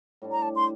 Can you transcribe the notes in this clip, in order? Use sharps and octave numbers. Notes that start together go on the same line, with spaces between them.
A2 G3 D4
A#5
A5
C6